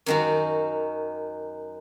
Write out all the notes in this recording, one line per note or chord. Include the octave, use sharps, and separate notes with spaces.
F#2 D#3 F#4